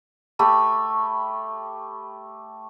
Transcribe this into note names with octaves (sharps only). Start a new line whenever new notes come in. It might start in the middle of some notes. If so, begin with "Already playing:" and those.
A3 G4 B5